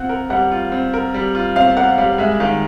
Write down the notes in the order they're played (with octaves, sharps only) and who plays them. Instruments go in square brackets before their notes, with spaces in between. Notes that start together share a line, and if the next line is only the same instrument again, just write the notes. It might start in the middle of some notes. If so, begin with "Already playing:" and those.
Already playing: [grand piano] C4 F4 [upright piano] F#5
[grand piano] A#4
[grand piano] G3 [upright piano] F#5
[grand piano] F4
C4
A#4
G3
F4
[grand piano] C4 [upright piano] F5
[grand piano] A#4 [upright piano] F#5
[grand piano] G3 [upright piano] F5
[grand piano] G#3 [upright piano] E5
[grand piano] D#3 [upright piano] F5